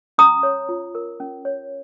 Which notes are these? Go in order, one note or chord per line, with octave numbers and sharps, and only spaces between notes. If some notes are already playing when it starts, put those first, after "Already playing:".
C#4 A#5 D#6
C#5
F4
A#4
C#4
C#5